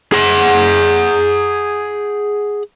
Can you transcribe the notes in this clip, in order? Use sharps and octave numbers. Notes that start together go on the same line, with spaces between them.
G#4 F#5